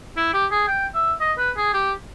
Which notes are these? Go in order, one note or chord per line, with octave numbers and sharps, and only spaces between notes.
E4
G4
G#4
G5
E5
D#5
B4
G#4
G4